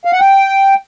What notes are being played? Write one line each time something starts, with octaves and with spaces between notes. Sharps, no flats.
F5
F#5
G5